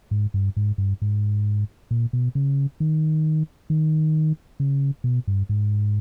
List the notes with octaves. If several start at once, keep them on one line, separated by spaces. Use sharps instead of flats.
G#2
G2
G#2
G2
G#2
A#2
B2
C#3
D#3
D#3
C#3
B2
G2
G#2